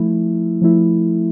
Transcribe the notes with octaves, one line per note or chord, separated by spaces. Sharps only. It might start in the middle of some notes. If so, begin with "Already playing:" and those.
Already playing: F3 A3 E4
F3 A3 E4